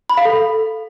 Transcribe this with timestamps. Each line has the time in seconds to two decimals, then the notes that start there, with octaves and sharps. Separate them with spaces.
0.10 B5
0.17 F5
0.25 A4